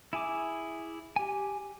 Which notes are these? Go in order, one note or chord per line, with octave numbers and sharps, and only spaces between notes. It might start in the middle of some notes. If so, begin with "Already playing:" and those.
E4 G#4 G#5 D6
G4 G#5